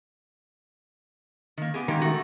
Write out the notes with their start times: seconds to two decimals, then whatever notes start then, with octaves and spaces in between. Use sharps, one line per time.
1.57 D#3 A#3
1.74 B3 G4 G#4
1.88 D#3 G#3 A#3 G4
2.02 A3 F#4